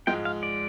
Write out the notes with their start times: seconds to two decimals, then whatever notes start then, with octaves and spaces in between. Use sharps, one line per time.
0.07 G#2 F3 G#3 G5
0.25 F5
0.43 D5